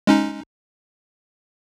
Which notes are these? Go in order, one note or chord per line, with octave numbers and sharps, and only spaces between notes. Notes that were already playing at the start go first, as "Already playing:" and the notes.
G#3 C#4 D#4